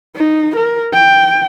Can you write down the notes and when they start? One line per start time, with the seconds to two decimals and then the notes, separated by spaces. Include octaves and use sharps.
0.16 D#4
0.56 A#4
0.94 G5